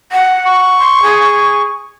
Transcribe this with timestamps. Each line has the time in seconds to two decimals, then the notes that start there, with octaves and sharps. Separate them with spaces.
0.12 F#5
0.46 C#6
0.79 C6
1.03 G#4